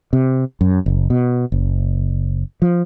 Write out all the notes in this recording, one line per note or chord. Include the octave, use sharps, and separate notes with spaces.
C3
F#2
F#1
B2
F#1
F3